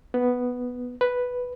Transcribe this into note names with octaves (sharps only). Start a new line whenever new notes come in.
B3
B4